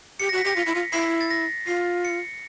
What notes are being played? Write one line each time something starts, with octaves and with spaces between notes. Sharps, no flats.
G4 C#7
A#6
F#4
B6
G4 A#6
F4 B6
E4
F4
E4 C7
B6
A6
A#6
F4 C7
C#7